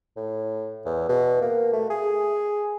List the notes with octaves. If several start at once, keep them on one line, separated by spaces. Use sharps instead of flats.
A2
E2
B2
A#3
A3
G#4